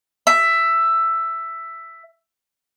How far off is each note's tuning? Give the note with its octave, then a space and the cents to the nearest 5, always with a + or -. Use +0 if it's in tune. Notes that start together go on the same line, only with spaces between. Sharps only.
E5 +10